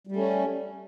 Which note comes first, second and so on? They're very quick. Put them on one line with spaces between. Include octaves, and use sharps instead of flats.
G3 A3 C#4